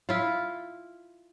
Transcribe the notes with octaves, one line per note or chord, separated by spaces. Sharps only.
E4 F4